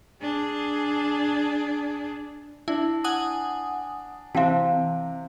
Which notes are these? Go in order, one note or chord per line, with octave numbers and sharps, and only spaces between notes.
D4 G#4
D4 E4
F#5 G#5 D#6
C3 E3 C4 F5 G5 A5